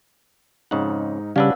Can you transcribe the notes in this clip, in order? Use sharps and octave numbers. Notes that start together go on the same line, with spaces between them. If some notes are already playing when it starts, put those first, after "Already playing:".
F2 G#2 C#3 D#4 F#5
C#3 G3 C#4 D4 B4 F5 F#5 E6